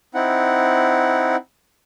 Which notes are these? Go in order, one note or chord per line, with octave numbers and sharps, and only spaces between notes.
C4 D#4 E4 F#5